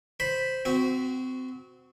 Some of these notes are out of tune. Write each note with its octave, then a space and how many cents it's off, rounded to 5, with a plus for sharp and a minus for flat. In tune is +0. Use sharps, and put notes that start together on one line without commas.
C5 -5 B5 +0
C4 -25 F#4 +0